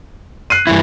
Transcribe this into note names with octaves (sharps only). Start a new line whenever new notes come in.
F#6 C7 D#7
G2 E3 E4